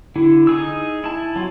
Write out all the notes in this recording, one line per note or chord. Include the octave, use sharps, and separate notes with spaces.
D3 E4
D#4 G#4 E6
E4 A5
F#3 F4